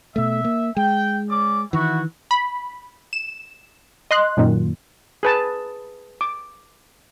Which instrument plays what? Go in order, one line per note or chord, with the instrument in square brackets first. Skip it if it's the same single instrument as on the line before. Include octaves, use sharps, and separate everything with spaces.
[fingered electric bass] B2 A3 [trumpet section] E5
[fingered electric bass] A#3
[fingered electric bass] G#3 [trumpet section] G5
[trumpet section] C#4 D5 D6
[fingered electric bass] D#3 E3 [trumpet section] E4 F#4
[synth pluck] B5
E7
D#5 C6 F#6
F#2 A#2 D#3
[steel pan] G#4 B4 A5
D6